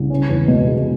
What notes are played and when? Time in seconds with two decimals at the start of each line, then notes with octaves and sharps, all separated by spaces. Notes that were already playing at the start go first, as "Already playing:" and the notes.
Already playing: C2 C#3
0.10 C#4
0.29 E2
0.48 B2
0.67 C3 G#3